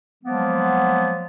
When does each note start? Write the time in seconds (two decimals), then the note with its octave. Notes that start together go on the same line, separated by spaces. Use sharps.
0.24 F3 F#3 G#3 A#3 B3